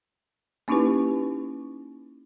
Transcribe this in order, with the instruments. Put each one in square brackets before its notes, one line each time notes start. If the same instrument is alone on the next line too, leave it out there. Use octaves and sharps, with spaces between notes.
[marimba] A#3 C#4 D#4 E4 G4 B4